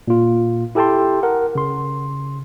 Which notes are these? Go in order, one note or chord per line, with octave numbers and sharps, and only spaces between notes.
A#2 F4
E4 G4 A4 G5 A5 C6
A#4 F#5
C#3 C6